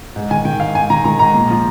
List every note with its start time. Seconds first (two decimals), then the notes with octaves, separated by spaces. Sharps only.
0.16 G#2
0.31 D#3 G#5
0.45 D#3 G5
0.60 G#2 F5
0.75 G#2 G#5
0.90 D#3 A#5
1.05 D#3 A#5
1.19 G#2 A#5
1.34 A#2
1.50 F3